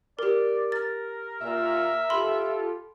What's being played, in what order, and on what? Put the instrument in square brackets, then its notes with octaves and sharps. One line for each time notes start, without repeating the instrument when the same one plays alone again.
[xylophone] G4 A#4 [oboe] D5
[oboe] A#4 [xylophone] A6
[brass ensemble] A#2 [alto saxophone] E5
[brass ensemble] F4 G4 A4 [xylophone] B5 C6